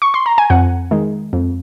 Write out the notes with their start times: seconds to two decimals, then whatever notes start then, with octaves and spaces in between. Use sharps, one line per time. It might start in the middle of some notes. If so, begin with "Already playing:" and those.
0.02 C#6
0.14 C6
0.26 A#5
0.38 G#5
0.50 F2 F#5
0.91 D#3 G#3
1.33 F2